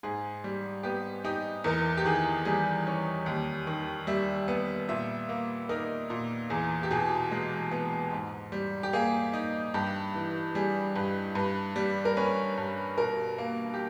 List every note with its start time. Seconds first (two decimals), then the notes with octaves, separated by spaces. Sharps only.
0.03 G#2 G#4
0.44 G3
0.83 B3 G4
1.25 D#4 G4
1.64 E2 A#4
1.97 G4
2.05 D#3 G#4
2.45 G3 G#4
2.87 C#4
3.26 D#2
3.67 D#3
4.07 G3 E5
4.48 B3
4.89 A#2 E5
5.29 A#3
5.69 D#4 A#4
6.10 A#2
6.50 E2 G#4
6.83 G4
6.91 B2 G#4
7.31 G#3
7.71 B3
8.12 G#2
8.52 G3
8.83 G4
8.93 A#3 G#4
9.33 D#4
9.74 G2 G4
10.15 E3
10.55 G3 G#4
10.95 G2 B4
11.35 G2 B4
11.76 G3
12.05 A#4
12.17 C#4 B4
12.57 G2
12.97 B2 A#4
13.38 A#3
13.74 G4